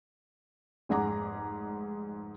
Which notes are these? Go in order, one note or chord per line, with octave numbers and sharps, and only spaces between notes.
F1 G#2 G#4 F#5 A#5 D6